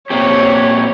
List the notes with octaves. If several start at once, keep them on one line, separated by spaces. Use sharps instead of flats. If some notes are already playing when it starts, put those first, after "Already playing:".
A#2 C4 G4 C#5